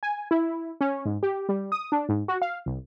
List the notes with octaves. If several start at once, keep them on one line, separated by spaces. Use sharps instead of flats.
G#5
E4
C#4
G#2
G4
G3
D#6
D4
G#2
F#4
F5
C2